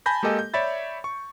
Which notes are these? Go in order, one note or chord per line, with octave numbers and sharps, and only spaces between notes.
G#5 A5 B5 G6 A#6
G#3 A#3 G4 A4 D#5 G#5
G6
C#5 D5 E5 B5 A6
C#6